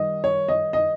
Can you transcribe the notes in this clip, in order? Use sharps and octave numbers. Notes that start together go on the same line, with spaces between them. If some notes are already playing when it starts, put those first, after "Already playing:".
Already playing: D#3 G3 D#5
C#5
D#5
D#5